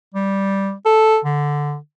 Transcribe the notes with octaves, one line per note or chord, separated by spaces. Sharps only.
G3
A4
D3